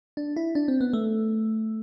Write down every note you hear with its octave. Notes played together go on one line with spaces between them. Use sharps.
D4
E4
D4
C4
B3
A3